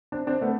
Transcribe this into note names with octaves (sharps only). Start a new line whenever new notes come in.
C4 D4
C4 D4
A3 B3